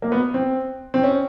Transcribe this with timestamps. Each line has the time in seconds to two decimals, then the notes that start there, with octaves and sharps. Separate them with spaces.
0.02 A#3
0.12 B3
0.34 C4
0.94 C4
1.03 C#4